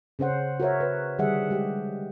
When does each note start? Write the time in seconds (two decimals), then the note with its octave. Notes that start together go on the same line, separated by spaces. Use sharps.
0.19 C#3 C#4 C5 F#5
0.60 F#4 A#4 C#5 E5
0.80 B4
1.18 D3 D#3 G3 G#4 E5 F#5
1.51 G#3 G4